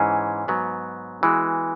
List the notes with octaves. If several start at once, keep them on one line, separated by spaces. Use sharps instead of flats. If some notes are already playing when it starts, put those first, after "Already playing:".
Already playing: G#2 E3 C#4 G#4
G#2 F#3 B3
E3 G#3 B3 F#4